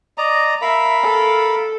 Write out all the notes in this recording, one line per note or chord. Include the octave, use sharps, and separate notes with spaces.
D5 D#5 A#5
A#4 E5 F5 B5
A4